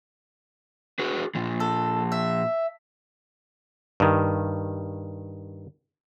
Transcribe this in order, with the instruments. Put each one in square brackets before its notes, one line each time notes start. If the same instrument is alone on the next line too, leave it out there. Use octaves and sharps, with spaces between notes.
[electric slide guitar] F#4 G#4 B4
A#2 F3
[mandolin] A4
E5
[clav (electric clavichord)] G2 D#3